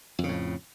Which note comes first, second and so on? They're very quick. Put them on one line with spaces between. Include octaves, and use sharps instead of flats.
F2 C#3 A2